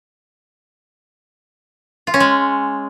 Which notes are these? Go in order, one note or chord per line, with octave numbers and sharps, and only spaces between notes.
F4
C#4
G#3